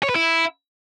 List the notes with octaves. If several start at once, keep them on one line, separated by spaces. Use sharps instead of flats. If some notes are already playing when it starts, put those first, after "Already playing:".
C#5
B4
E4